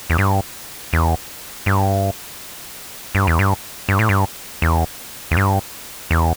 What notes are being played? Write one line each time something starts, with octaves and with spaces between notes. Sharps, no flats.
E2
G2
E2
G2
G2
E2
G2
G2
A2
G2
E2
E2
G2
E2